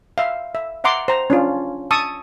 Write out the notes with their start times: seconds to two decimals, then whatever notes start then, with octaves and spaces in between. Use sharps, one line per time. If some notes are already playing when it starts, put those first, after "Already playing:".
0.18 E5 F5
0.55 E5
0.84 E5 F#5 A#5 C6 D6
1.08 C5 A#5
1.30 C#4 D4 F4
1.91 A5 C#6 D#6 E6